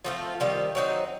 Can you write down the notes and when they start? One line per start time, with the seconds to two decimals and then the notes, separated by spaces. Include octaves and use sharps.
0.04 F3 A3 C4 F4
0.40 D#3 G3 C4 F4
0.75 F#3 A3 C4 D#4